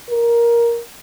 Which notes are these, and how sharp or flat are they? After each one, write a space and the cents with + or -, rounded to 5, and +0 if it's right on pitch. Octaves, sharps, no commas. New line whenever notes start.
A#4 +10